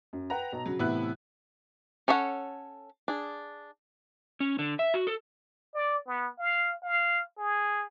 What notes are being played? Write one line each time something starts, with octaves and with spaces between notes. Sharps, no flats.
F#2
B4 F#5 G5 A#5
B1
C#3 F#3
A2 C3 E3 B3 E4 F#6
C#4 A4 C#5 E5 F#5
D4 G#4
C#4
D3
E5
F#4
A4
D5
B3
F5
F5
G#4